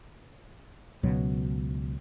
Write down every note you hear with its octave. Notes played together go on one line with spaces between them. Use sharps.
C#2 B2 F#3